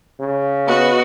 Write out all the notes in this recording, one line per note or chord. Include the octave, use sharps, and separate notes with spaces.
C#3
B3 F#4 B4 D#5